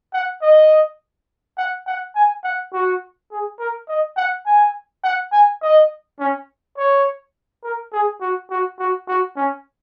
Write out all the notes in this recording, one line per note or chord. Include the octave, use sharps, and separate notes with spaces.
F#5
D#5
F#5
F#5
G#5
F#5
F#4
G#4
A#4
D#5
F#5
G#5
F#5
G#5
D#5
C#4
C#5
A#4
G#4
F#4
F#4
F#4
F#4
C#4